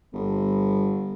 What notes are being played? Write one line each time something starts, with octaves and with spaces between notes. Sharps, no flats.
G1